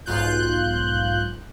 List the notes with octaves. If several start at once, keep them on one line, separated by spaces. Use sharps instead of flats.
B1 G#2 F4 F#6 G6